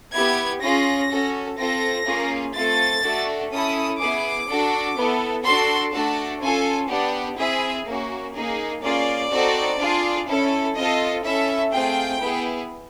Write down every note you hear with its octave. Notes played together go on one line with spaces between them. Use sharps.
B3 E4 G4 G#6
C#4 F4 G#4 A#6
C#4 F#4 A4
C4 F4 A4 A#6
A#3 C#4 F4 G#4
A3 C4 F4 A4 A6
A3 D4 F#4 A4
C#4 E4 A4 D#6
B3 E4 G#4 D6
D4 F#4 A4
B3 E4 A4
D4 F#4 A4 C6
A3 D4 F#4 A4 A5
C#4 F4 A4 G#5
B3 D4 G4 F#5
C4 E4 G#4 E5
A#3 C#4 F#4
A#3 D#4 G#4
A#3 C#4 F4 G#4 D5
C4 D#4 F#4 A4
D4 F4 G#4
C#4 E4 A4
C4 F4 A4 D#5
C#4 E4 A4 E5
A3 C4 F4 G#4 G5
B3 E4 G#4